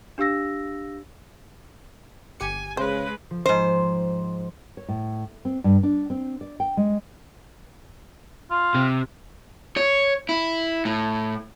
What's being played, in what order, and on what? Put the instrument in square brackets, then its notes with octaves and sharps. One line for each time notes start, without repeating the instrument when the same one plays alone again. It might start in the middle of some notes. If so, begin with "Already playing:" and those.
[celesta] D4 G4 F5 E6 A#6
[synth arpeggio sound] G1 G4 C#7 [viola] G#5
[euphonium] C#3 [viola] G#3 B4 [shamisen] C5
[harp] F3
[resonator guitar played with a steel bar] G#2 C5
[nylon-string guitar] C#5
A2
C4
G2
D4
C4
D5
G5
G#3
[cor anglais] F4
[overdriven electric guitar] C3
C#5
E4
A2